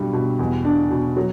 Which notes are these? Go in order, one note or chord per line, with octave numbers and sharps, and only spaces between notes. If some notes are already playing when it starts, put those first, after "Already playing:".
Already playing: G2 B2 G3
B2
E2
D4
B2
F#3